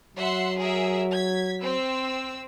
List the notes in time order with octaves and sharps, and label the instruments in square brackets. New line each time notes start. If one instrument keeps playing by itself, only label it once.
[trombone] F#3 [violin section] E5 F#5 C6
[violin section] G#4 A#4 E5
G#6 B6
C4 E6